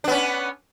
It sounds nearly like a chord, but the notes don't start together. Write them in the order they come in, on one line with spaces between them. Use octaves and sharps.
D4 B3 C#4